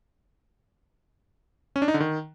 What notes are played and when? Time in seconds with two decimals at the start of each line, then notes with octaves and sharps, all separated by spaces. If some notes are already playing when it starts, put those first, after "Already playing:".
1.76 C#4
1.82 D4
1.88 D#4
1.94 D3
2.00 D#3